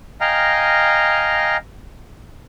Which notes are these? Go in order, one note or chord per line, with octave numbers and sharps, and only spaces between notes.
D#5 F5 G5 G#5 A#5 F6